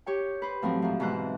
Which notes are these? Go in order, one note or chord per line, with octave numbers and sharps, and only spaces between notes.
G4 C#5 G5
B4 C5
A2 F3 F#3 C4
G#2 F3
G#2 B2 E3 C5 F#6